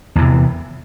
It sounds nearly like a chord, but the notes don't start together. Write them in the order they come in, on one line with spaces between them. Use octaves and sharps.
E2 E3 C3